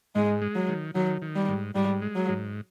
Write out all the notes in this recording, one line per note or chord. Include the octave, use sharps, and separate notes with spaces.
G#2 G#3
G#3
F#3
D#3
D#3 F#3
D#3
G3
G#2
G#2 G3
G#3
F#3
G#2